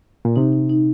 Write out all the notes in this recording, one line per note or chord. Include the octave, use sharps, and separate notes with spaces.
A#2
C3 D#4
D#4
D#4